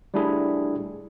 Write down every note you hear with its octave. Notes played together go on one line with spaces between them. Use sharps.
G3 A3 D4 E4 G#4